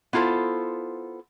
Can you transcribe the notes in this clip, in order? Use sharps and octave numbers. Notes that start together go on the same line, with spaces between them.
B3 E4 F4 A4 C5